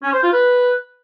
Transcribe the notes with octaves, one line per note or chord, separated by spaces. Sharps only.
C#4
C5
F4
B4